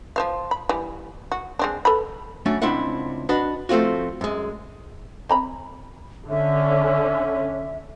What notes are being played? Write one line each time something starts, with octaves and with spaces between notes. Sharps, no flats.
F3 C5 F5
B5
E3 G3
F#4
G#3 C4 D4
A4 B4 B5
F#3 A3 C#4 D4
C#2 C4 D4 E4 E5 F#5
D4 F#4 B4 D#5
F3 A3 C4 F4 F#4
F#2 G#3
C4 A#5 B5
D3 C#4 E5